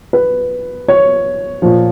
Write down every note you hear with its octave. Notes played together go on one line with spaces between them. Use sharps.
B4
C#5
A#2 F3